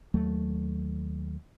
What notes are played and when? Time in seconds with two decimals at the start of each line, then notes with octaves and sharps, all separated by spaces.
0.14 D#2 F#3 A3